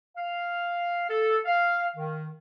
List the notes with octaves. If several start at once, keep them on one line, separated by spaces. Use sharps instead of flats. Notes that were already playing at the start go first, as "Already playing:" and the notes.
F5
A4
F5
D#3